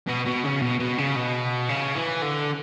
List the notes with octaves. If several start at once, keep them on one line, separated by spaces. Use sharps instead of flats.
B2
B2
C#3
B2
B2
C#3
B2
C#3
E3
D3